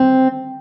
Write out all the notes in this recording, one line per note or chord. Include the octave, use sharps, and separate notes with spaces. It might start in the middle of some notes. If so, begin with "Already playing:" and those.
Already playing: C4